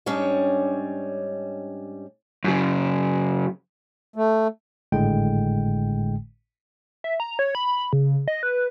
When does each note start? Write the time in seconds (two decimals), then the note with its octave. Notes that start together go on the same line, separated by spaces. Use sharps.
0.06 G#2 G3 C#4 D4 C#5 D#5
2.44 F#2 C#3
4.16 A3
4.92 G#1 A2 D3 G#3 G5
7.04 E5
7.20 A#5
7.39 C#5
7.55 B5
7.93 C#3
8.28 D#5
8.43 B4